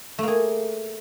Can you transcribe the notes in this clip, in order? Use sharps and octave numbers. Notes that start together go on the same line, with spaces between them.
A3 A#3 G#4